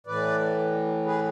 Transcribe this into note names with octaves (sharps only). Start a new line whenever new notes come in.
A2 E3 B4 D5
G#4 B4